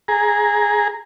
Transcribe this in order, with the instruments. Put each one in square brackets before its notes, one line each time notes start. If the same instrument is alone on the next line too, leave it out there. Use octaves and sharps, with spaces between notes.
[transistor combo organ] G#4 A#5